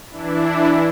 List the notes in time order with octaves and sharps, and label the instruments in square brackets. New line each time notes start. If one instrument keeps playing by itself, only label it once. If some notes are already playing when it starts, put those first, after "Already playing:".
[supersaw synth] E3 D4 E4